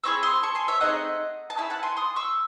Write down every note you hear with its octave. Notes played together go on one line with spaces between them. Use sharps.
C4 E4 G#4 C#6 E6
C6 D#6
A5 C#6
G#5 C6
C#5 E5
A3 C4 D#4 G#4 D#5 F#5
A5
C#4 E4 G#4 E5 G#5
F#5 A5
G#5 C6
C6 D#6
C#6 E6